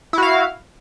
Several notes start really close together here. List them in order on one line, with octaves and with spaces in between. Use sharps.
E4 F#4 F5